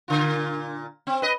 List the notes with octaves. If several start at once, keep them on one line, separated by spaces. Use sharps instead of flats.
A#2 D3 F4
C4
B4 D#5